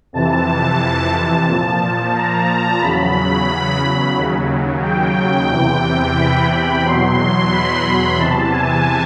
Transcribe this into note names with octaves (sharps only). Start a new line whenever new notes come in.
F2 C3 E3 A5
A#2 F3
A#5
E2 C#3 F#3 B5
D#2 C#3 F#3
G5
E2 C3 E3 G5
B5
E2 B2 F#3 C6
B5
E2 C3 E3 A5
G#5